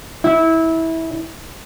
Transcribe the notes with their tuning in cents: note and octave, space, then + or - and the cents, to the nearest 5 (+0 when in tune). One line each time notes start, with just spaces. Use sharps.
E4 -20